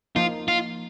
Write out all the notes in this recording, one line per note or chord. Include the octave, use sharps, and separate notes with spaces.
F3 A#3 D#4 F4
F4